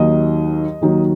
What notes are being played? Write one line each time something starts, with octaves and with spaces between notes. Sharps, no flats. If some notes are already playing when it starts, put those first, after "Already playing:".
Already playing: D#2 D#3 F#3 D#5
D#2 D#3 F#3